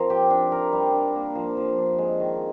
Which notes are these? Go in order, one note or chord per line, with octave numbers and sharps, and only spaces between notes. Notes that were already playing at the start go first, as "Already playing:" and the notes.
Already playing: F3 C4 F4 A#4
G4
D4
A#4
G3
D4
A#3
F3
F3
D4
G#3
D#3